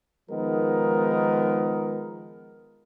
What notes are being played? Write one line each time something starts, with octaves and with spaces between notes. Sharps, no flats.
D#3 F3 G#3 B3 D#4 A#4